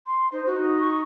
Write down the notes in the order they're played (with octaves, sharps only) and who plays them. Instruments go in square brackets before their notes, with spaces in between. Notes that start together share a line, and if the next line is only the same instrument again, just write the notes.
[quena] C6
[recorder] D#4 [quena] C5
[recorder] D#4 [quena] F#4
[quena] C#6